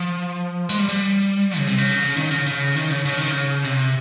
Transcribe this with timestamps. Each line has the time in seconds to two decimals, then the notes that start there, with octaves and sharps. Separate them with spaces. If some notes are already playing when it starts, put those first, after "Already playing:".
Already playing: F3
0.69 G#3
0.79 G3
0.89 G3
1.58 C#3
1.67 C3
1.78 C#3
2.17 D#3
2.31 C#3
2.46 C#3
2.76 D#3
2.90 C#3
3.05 C#3
3.18 D#3
3.31 C#3
3.64 C3